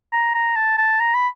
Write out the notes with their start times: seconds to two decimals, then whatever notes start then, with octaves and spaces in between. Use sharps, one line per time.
0.12 A#5
0.35 A#5
0.56 A5
0.78 A5
1.00 A#5
1.15 B5